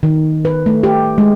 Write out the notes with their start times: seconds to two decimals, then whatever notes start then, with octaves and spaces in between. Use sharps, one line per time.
0.03 D#3
0.45 B4
0.66 A3
0.83 G4
1.18 G#3